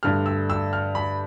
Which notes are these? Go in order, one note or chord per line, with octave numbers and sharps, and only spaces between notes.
G2 D3 A3 F6
E6
E6
F6
B5